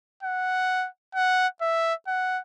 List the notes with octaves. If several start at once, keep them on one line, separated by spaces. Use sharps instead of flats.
F#5
F#5
E5
F#5